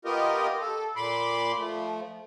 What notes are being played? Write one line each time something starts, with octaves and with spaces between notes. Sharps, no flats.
B3 F4 G4 A#4 D#5
A4
A#2 B5 C6 D6
F3 A3